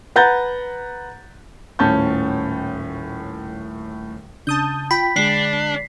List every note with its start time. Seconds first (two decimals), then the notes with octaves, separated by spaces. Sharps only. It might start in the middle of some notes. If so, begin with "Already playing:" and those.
0.16 B4 F#5 A#5 G6 A6
1.79 D#1 A2 C#4 A5 C#6 G6
4.47 C#3 D4 A5 D#6 G6
4.91 F4 G5 B5 B6
5.16 D3 G#3 D4 G#4 C7